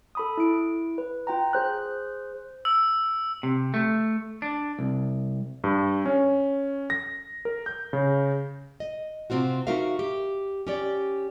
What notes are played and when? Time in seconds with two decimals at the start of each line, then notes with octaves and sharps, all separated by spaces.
0.15 A4 B5 D#6
0.38 E4 D7
0.98 B4
1.27 F4 G5 A#5
1.53 G#4 C5 F#6
2.65 E6
3.43 C3
3.74 A3
4.42 D4
4.79 C2
5.64 G2
6.06 C#4
6.90 A#6
7.45 A#4
7.66 G6
7.93 C#3
8.80 D#5
9.30 C3 C4 F4 F#4
9.67 D#4 F#4 A#4 E5 F5
9.99 G4
10.67 C#4 G4 D5